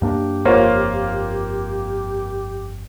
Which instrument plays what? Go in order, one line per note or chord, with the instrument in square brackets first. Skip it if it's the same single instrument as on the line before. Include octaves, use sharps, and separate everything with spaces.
[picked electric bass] F#2 A#3 D4 [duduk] G4
[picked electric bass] G1 F2 [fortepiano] A#3 F4 [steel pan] C5 C#5 F5